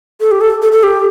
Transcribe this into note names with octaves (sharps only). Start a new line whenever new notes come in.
A4
G4
A4
A4
A4
G4